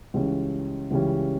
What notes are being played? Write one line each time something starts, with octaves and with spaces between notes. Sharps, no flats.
C#2 C#3 E3 G3 C#4
C#2 C#3 E3 G3 C#4